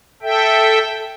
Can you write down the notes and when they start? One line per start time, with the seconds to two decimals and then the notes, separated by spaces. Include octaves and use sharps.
0.22 A4 E5 G5